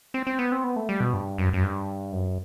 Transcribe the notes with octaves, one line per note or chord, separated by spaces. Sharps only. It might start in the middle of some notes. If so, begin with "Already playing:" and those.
C4
C4
B3
C4
B3
A3
G3
B2
G2
F#2
F#2
G2
F#2